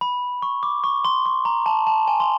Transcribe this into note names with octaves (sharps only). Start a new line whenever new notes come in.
B5
C#6
D6
C#6
C6
C6
A#5
A5
A5
G#5
C6